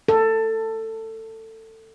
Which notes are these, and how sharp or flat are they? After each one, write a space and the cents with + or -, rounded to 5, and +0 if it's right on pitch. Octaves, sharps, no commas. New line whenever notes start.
A4 +20